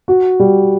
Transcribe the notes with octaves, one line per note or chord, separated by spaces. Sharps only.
F#4
G3